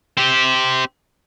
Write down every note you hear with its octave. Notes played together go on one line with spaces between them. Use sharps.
C4 G4